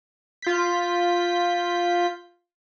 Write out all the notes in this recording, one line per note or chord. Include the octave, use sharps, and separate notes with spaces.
F4 G6 B6